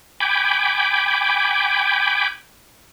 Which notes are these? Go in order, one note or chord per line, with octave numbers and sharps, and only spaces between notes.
G5 G#5 B5 D6